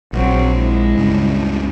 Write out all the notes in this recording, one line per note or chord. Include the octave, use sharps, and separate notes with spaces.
A#1 F#3 C4
G#3 E4
C#2 G2 C#3